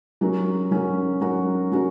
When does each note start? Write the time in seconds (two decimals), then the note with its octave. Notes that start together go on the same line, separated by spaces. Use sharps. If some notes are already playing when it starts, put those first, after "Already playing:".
0.21 F#3 C#4 F#4 A#4
0.71 F#3 C#4 F#4 A#4
1.21 F#3 C#4 F#4 A#4
1.72 F#3 C#4 F#4 A#4